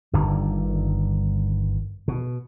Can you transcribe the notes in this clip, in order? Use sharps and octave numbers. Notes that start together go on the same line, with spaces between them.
G1 G2 D3 D#3
B2